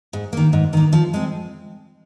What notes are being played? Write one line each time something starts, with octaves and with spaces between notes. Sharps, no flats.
G#2
D#3 A#3
G#2
D#3 A#3
F3
G#3 C4